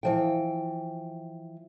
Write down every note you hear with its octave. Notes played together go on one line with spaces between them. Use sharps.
E3 F3 G5